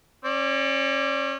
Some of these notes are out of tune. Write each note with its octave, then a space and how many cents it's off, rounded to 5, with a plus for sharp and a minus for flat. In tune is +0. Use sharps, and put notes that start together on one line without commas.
C#4 -30 D5 +0